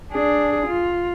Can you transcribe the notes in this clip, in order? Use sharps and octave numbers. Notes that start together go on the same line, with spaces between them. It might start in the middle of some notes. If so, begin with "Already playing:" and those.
D4 G#4
F4